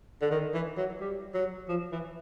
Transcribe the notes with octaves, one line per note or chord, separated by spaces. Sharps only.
D3
D#3
E3
F#3
G3
F#3
F3
E3